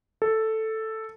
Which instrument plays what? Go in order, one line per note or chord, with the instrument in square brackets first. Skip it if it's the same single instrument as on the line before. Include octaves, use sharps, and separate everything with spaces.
[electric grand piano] A4